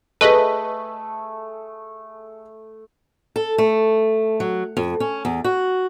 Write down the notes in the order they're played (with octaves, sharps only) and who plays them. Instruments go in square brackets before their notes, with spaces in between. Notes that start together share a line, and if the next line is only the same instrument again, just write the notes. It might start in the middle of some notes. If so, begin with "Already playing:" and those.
[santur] A3 [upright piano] G#4 A4 [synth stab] B4 D#5
[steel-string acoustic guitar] A4
A3
F#3
F2
C#4
E2
F#4